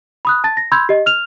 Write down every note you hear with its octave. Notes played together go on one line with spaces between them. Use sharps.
B5 D#6 F#6
A5 A6
A#6
B5 C6 E6 G6 G#6
G4 D#5
F6 F7